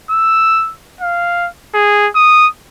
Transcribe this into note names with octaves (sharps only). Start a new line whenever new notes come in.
E6
F5
G#4
D#6